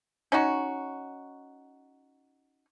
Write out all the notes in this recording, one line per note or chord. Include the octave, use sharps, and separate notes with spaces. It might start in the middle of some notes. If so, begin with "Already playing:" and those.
C#4 D#4 F#4